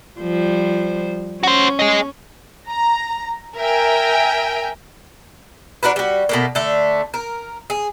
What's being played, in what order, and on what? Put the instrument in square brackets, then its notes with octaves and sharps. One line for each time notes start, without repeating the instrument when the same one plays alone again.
[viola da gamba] F3 G3 C5
[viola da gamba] C#4 [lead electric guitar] F#4 C5
[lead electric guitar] G#4 D#5
[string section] A#5
A#4 E5 G5 G#5
[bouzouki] D4 F#4 A#4 B4
G3 F#4
B2 A3 A#3
D3 A3
A#4
G#4